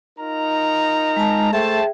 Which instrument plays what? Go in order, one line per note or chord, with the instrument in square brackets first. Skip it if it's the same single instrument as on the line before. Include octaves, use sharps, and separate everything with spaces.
[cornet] D#4 [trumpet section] F4 A#4 A#5
[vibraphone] G#3 A5
[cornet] A3 [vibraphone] G#4 E5 G5 [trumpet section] C5 A5